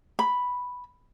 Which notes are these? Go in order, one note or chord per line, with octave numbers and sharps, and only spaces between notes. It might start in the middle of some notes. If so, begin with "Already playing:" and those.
B5